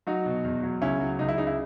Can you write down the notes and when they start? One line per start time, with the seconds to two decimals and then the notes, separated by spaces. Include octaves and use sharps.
0.07 F#3 D#4 F#4
0.26 B2
0.44 E2
0.63 F#3
0.82 C#2 C#4 E4
1.00 F#3
1.19 C#2 D#4
1.28 E4
1.38 C#3 D#4
1.47 E4